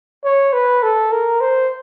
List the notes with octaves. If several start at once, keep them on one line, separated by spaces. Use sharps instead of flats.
C#5
B4
A4
A#4
C5